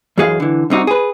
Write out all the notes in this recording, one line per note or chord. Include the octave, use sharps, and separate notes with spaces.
F#2 E3 F#4 G#4 D#5 F5
D3 E3
C2 C3 D#4 F#4
G#4 B4